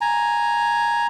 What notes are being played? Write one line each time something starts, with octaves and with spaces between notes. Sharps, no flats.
G#5 A#5